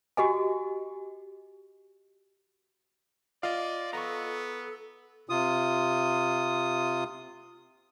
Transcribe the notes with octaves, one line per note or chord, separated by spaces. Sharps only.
F#4 G4 D#5 G#5
F4 D5 D#5 F5
B3 A4 A#5 C#6
C3 F4 D#6